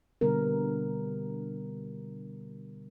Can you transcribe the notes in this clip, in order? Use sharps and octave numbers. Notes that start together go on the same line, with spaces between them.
B2 D3 G3 B3 A#4